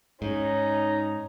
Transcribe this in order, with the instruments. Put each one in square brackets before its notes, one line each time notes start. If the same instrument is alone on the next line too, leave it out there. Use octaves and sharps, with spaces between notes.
[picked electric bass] G#2 [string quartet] C#4 [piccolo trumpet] D#4